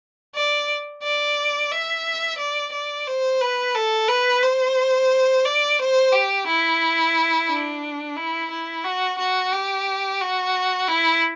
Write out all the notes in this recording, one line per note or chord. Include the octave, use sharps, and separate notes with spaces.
D5
D5
E5
D5
D5
C5
B4
A4
B4
C5
D5
C5
G4
E4
D4
E4
E4
F#4
F#4
G4
F#4
E4